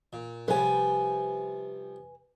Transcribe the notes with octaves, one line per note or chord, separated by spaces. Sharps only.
A#2
C3 F3 G3 B4 G#5